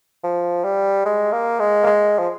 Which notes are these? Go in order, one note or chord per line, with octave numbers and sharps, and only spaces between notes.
F3
G3
G#3
A#3
G#3
A#3
G#3
F3